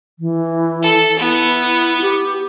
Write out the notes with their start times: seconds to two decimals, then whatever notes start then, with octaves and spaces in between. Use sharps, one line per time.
0.19 E3
0.83 A4
1.19 B3 E4
2.02 G4